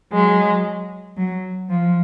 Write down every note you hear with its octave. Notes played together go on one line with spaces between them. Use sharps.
F#3 G#3
F#3
F3